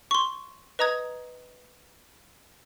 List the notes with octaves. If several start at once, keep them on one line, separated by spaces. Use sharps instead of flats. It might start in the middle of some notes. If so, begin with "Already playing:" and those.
C6 C#6
B4 D#5 A#5 D#6 G#6